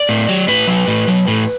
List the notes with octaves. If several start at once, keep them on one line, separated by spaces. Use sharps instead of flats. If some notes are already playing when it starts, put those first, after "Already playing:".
Already playing: D5
A2
F#3
A2 B4
F#3
A2
F#3
A2